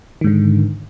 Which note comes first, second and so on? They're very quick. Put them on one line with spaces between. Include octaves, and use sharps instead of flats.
D#3 G#2 D3